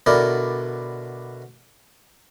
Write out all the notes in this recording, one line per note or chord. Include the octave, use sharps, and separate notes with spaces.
B2 D3 E4 A#4 D5